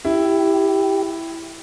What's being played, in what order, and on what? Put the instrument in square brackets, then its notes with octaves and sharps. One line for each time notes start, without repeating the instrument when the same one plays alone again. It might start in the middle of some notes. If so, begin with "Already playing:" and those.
[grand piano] E4 [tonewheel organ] G4